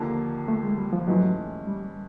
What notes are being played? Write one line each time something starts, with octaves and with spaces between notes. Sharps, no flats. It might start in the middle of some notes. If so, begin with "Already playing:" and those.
Already playing: D#2 D3 F3 A#3
A3
G#3
G3
F3
G#2 E3 F#3 A3 C#4
G3